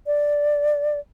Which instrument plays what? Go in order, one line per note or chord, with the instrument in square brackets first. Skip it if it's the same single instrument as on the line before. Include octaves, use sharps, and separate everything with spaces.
[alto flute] D5